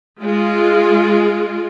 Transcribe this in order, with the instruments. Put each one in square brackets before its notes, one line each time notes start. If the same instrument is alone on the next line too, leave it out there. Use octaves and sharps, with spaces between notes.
[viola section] G#3 F4